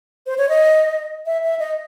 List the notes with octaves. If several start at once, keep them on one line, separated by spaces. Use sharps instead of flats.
C5
C#5
D#5
E5
E5
D#5